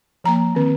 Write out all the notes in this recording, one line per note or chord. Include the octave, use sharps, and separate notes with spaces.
F3 A#3 A#5
D#3 C4